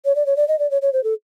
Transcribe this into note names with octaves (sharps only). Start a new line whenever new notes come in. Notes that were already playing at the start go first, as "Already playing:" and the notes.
C#5
D5
C#5
D5
D#5
D5
C#5
C#5
C5
A4